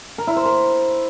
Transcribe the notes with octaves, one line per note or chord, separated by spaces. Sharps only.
A#4
E4
C5
A#4